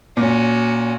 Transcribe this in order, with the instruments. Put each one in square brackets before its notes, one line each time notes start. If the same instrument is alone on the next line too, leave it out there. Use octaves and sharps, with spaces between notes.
[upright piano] A#2 [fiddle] C#4 F#4